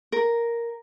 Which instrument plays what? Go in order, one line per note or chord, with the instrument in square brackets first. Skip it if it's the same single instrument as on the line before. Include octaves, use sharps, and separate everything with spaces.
[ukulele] A#4